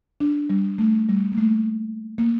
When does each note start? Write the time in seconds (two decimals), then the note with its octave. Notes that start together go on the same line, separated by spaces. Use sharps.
0.20 D4
0.50 G3
0.78 A3
1.09 G3
1.32 A#3
1.38 A3
2.18 A#3